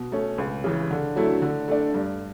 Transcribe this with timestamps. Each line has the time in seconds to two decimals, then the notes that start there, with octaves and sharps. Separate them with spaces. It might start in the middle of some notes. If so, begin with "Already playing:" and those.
Already playing: B2
0.12 A3 C#4
0.38 C#2
0.64 C#3 E3
0.91 D3
1.16 F#3 A3 E4
1.42 D3
1.68 A3 D4
1.94 G2